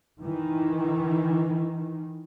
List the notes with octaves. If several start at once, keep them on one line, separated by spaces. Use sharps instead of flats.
D#3 E3